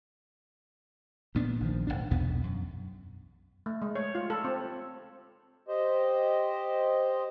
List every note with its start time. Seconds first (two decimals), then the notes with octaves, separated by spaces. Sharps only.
1.35 D2 A#2 B3 D4
1.60 A#1 D#3 F3
1.87 D1 G#1 G#2 D4
2.11 B1 E2 B2 B3
2.43 F#2
3.66 A3
3.82 G#3
3.95 C#5
4.15 F4
4.30 A4
4.44 C4
5.68 G4 C5 D#5